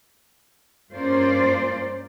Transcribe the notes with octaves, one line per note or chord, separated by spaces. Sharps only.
G2 A#3 C#4 F4 C5 D5